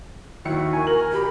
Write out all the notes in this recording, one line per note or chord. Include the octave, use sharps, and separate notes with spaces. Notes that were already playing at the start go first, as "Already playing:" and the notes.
D#2 E4 F#4 C#7
A#4 G#5
A#4 F#7
G4 A#4 B5